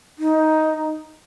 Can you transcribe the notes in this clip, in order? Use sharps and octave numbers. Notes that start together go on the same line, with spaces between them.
D#4